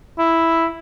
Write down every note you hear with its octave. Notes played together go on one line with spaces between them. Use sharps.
E4